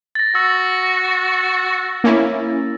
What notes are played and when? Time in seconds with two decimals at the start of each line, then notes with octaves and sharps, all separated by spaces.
0.15 A6 A#6
0.35 F#4 E6
2.04 A#3 C#4 E4